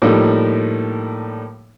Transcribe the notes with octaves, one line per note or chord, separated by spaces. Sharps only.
A2 F3 G3 A3 A#3 D#4